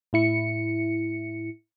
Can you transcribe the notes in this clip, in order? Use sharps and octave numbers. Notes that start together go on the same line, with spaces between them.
A2 E4 C#7